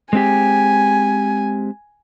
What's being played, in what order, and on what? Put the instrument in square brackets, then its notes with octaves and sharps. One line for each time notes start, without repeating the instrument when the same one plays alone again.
[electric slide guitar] G#3 C4 G4 [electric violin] G#5